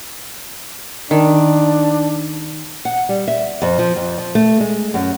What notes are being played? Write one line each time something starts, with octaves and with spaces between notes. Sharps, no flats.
D#3 D4
F#5
G3
E5
F2
F3
F2
F3
A3
G#3
F#2